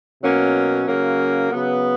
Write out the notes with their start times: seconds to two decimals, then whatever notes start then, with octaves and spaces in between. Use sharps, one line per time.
0.22 B2 F#3 A#3 C#4
0.87 C#3 F#3 A#3 C#4
1.51 C#3 F#3 B3